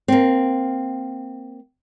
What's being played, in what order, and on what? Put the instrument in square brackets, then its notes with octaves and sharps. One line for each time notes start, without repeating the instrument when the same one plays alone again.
[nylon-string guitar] A#3 C4